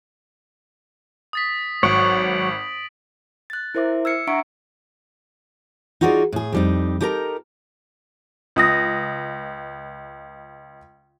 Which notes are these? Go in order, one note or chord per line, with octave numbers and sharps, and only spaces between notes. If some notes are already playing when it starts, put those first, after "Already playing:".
D#6 A6 B6
G#1 F#3 F#4 C#5 D7 F#7
F#6 A6
E4 A#4 C5 E5 D6
E6 F6 G#6 C7 C#7
D4 E5 F#5 A#5 C#6 D7
D#4 F4 F#4 G#4 C#5 D5
A2 G#4
F2 G3 D#4
D#4 G4 A4 A#4 A#5
C#2 D#6 A#6